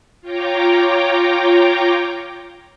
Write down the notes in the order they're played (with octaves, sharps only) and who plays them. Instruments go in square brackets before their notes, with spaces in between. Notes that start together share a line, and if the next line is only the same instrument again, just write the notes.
[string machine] F4 C#5 G5 A#5 D6